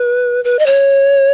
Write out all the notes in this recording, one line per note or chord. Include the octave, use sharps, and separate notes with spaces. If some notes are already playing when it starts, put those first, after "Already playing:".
Already playing: B4
B4
D#5
C#5